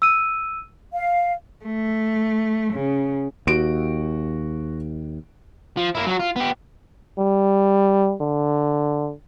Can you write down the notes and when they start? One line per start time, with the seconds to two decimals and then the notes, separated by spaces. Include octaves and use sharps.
0.02 E6 D#7
0.93 F5
1.65 A3
2.73 C#3
3.47 D#2 F#4 D7
5.77 F3
5.95 A#3 E4
6.06 F#3 F#4
6.19 F4
6.36 B3 G4
7.18 G3
8.21 D3